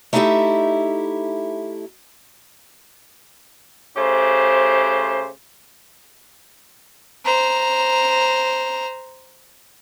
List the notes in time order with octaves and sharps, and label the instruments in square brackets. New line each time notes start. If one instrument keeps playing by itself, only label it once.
[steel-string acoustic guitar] A3 D#4 E4 G4 A4 E5
[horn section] C#3 A3 G4 C5
[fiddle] C5 A#5